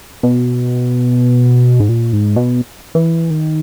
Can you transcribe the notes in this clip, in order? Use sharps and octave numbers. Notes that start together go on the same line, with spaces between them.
B2
G#2
A#2
G#2
B2
E3
D#3